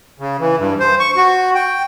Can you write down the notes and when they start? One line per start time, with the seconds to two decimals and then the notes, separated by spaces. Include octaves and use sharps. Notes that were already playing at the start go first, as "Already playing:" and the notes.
0.20 C#3
0.39 E3
0.59 G2
0.80 C5
0.99 C#6
1.16 F#4
1.55 G5